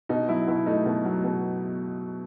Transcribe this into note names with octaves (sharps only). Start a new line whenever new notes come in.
B2 D#4
F#3 E4
B2 E4
A3 D#4
B2
F#3
B2